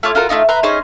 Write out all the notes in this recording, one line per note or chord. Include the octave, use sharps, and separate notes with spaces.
A3 F4 C#5 D6
F4 F#4 A4 A#4
A3 D4 D#4 F4
B4 E5 A#5 C6
C#4 D#4 G#4 C5